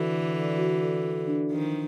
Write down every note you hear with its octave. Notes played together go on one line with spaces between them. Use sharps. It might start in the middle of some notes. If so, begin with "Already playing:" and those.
Already playing: D3 E3 F#4 A4
F#4
D5
F#4
A4
F#4
D4
D#3 F3 D4